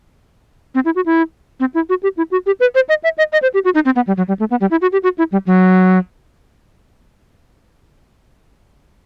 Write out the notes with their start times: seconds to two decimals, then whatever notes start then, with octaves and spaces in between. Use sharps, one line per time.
0.75 C4
0.85 E4
0.96 F#4
1.06 E4
1.60 C4
1.74 E4
1.89 F#4
2.03 G4
2.17 E4
2.31 F#4
2.46 G4
2.60 B4
2.75 C5
2.89 D#5
3.04 E5
3.18 D#5
3.33 D#5
3.42 C5
3.54 G4
3.65 F#4
3.75 D#4
3.85 C4
3.96 B3
4.07 G3
4.17 F#3
4.28 G3
4.39 A3
4.51 B3
4.61 G3
4.71 E4
4.82 F#4
4.92 G4
5.03 F#4
5.18 E4
5.32 G3
5.47 F#3